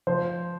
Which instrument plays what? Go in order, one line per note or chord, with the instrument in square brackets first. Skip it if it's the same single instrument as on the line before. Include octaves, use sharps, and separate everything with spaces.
[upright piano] F3 C5